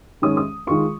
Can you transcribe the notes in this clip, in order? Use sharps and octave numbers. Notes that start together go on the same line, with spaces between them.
G#2 D#3 G#3 C#4 D#6
D#6
D#3 G#3 F4 C#6